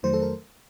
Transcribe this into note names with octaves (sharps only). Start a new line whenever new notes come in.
F2 D#3 F#3 A3 C5
A4
A#4